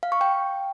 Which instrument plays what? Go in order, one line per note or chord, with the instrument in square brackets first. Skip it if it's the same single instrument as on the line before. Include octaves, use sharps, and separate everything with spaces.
[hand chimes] F5
C#6
G5